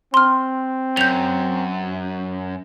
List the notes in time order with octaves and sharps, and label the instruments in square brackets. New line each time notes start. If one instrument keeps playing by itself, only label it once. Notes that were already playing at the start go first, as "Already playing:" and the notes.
[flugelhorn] C4 [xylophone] C6 F6
[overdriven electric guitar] F#2 [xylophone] G6 F7